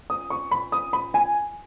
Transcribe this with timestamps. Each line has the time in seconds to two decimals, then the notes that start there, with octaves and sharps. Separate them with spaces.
0.10 D#6
0.30 C#6
0.51 B5
0.72 D#6
0.93 B5
1.14 G#5